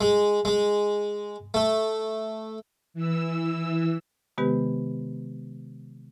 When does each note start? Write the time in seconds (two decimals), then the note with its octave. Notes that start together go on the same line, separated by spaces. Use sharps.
0.01 G#3
0.45 G#3
1.54 A3
2.94 E3 E6
4.38 C3 D#3 G#3 B3 G4 B4